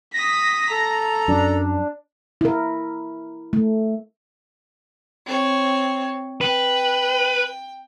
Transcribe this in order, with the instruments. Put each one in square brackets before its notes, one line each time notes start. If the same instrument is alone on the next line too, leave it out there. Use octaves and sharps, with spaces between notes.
[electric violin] D#6 B6 [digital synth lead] A#6
[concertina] A4 [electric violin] A#5
[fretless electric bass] F#2 [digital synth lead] D4
[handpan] E4 A#4
A3
[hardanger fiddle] C4 C#5
[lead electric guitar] B4 [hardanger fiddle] G5